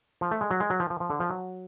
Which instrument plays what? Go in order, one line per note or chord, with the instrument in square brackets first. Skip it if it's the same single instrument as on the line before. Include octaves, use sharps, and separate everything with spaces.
[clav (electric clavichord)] F3
A3
G#3
F#3
G#3
F#3
F3
F3
F3
D3
F3
F#3